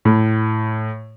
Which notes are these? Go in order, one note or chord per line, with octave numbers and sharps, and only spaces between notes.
A2